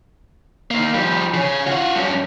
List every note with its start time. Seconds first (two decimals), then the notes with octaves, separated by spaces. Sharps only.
0.71 D#3 A#3
0.94 F3 G3
1.34 C#3 C#5
1.66 F4 F#4
1.95 G2 C#4